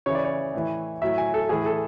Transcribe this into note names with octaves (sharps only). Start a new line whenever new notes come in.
C#3 E3 C#5
D5
C#5
A2 E3
A2 F#3 E5
G#5
A4
A2 E3 G#4
A4